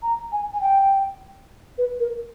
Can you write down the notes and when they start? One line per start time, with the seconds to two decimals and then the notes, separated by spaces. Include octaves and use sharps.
0.02 A#5
0.32 G#5
0.53 G#5
0.61 G5
1.78 B4
2.00 A#4